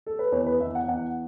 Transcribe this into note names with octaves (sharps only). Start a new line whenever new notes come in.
A4
B4
E2 C#5
B4
E2 E5
F#5
E2 F#5